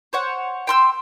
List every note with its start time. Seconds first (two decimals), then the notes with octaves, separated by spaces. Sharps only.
0.13 C5 C#5 F#5
0.67 G5 C6 E6